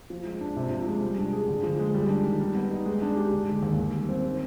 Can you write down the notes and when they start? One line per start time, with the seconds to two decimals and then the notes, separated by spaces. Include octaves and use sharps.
0.10 F3
0.25 G#3
0.41 D4
0.56 C3
0.71 F3
0.87 G#3
1.03 G3
1.18 D4
1.33 G#4
1.48 D3
1.63 F3
1.79 G#3
1.94 G3
2.09 D4
2.24 D#3
2.40 G3
2.55 B3
2.71 D#4
2.85 G#3
3.02 D4
3.16 G4
3.32 D3
3.47 G#3
3.63 D#2
3.79 D#3
3.94 G3
4.09 C4
4.24 D#3